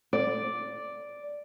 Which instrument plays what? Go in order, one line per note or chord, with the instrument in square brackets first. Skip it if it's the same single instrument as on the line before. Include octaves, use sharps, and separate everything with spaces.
[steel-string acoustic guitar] D5